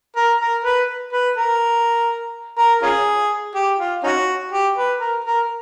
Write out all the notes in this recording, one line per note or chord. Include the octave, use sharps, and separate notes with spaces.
A#4
A#4
B4
B4
A#4
A#4
C#4 F4 G#4
G4
F4
C#4 D#4 F#4
G4
B4
A#4
A#4